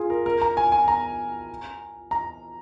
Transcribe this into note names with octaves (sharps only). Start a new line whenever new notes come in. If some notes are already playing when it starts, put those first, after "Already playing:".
Already playing: F4 G#4
A#4
A#4
A#5
G#5
G#5
A#5
A#5